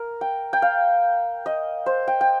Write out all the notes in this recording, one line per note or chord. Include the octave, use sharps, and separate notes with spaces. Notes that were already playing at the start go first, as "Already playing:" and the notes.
Already playing: A#4
G5
G5
F5
D#5
C5
G5
G5